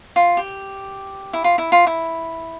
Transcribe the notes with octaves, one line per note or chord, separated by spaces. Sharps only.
F4
G4
E4
F4
E4
F4
E4